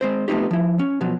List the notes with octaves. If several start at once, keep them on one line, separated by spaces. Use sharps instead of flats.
G#3 C4 C5
A3 B3 C4 D#4 G4
F3 E4
C#4
B2 F3 F#3